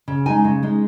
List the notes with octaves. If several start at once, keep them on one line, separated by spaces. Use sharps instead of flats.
C#3
G#3 D#4 G#5
C#3
G#3 D#4